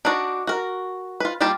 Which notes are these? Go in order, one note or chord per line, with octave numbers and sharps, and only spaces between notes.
D4 D#4 F#4 D5
F#4 A#4
F4 B4
G3 A#3 F4 G4 A5